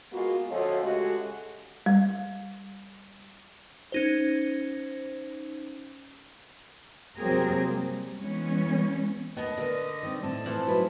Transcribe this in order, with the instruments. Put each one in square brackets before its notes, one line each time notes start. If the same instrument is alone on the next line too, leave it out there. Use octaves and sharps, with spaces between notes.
[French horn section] G#3 A#3 B3 F4 F#4
D2 F3 C#4 F#4 A4 D#5
C#3 G#3 A3 F#4 G4 A4
[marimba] G3
[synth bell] C#4 D#4 C5
[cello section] C3 F#3 A#3 C4 G#4 A#4
G3
E3 G#3 B3 C#4
[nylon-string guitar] D#2 A5 [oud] B3 [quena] D#5
[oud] D3 [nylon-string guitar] A#4 B4
[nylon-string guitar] D#3 C4
[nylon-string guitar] A2 C4 [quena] A5
[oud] E3 F3 A3
[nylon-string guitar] F#3 D#4 B4